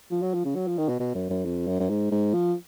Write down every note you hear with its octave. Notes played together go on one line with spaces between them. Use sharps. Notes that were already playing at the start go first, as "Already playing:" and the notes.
F3
F#3
F3
C#3
F#3
F3
D#3
B2
B2
F#2
F#2
F2
F#2
F#2
G#2
G#2
F3